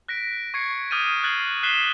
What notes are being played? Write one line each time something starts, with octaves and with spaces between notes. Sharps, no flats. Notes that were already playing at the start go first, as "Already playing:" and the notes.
F#6 A#6 B6 D7
C#6 G#6 C7 C#7
D6 D#6 F6 G6 A6 D#7
F#6 G#6 A6 C7 F#7
F#6 B6 C7 E7 G7